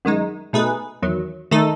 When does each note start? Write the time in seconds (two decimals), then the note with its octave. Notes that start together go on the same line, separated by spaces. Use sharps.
0.05 F#2 D#3 G#3 D#4
0.53 B2 A3 D#4 G#4 B4
1.02 E2 D#3 F#3
1.51 D#3 A3 D#4 A4